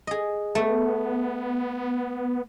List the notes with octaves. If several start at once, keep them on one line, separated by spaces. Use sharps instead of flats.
G#4 D#5
A3 B3